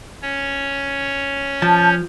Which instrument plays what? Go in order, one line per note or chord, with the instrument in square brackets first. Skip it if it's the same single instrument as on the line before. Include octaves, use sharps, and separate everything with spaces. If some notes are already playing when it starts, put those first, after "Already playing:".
[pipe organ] C#4 C#5
[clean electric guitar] F3 [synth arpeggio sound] A5 [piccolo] G6